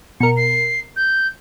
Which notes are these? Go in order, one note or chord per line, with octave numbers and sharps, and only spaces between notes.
B2 A#4 C#7
C7
G6